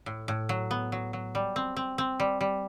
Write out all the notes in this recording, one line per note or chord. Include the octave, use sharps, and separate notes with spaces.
A2
A2
F#3
B3
F#3
F#3
G3
C4
C4
C4
G3
G3